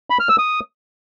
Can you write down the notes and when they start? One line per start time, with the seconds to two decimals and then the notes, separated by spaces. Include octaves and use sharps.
0.10 B5
0.20 F6
0.29 E6
0.38 D#6